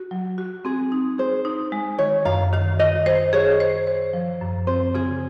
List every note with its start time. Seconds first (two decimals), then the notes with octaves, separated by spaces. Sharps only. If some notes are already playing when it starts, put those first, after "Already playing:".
Already playing: F#4
0.11 F#3
0.38 F#4
0.65 C4 G#4
0.92 D#4
1.18 G#4 C5
1.45 D#4
1.72 G#3
1.99 D#3 C#5
2.25 F#2 F5
2.53 D#3 F5
2.79 D#3 D#5
3.06 C5 D#5
3.33 G#4 C#5
3.60 C5
3.87 C5
4.13 F3
4.41 F#2
4.67 C4 C5
4.95 C#3 G#4